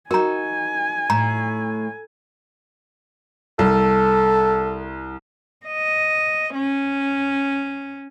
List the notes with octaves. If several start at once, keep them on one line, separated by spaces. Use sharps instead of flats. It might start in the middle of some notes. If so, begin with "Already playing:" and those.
D#4 F#4 A#4 G#5 A#5
A2 A#5
C2 A4
D#5
C#4